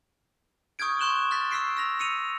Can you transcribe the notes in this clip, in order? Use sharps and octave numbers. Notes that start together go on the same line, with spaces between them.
C#6 D#6 F6 G6 G#6 D7
C6 C#6 F#6 E7 F#7 G7
F6 F#6 A6 B6
C#6 E6 F6 B6 C7 D7
E6 A#6 F7
E6 C#7 D#7 F7